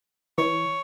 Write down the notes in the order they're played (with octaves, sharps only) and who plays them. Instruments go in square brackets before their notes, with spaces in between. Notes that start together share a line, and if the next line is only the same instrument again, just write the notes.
[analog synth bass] E3 [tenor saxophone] C#5